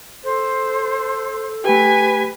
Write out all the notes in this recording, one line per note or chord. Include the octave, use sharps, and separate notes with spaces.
A4 C5
A3 G4 B4 G#5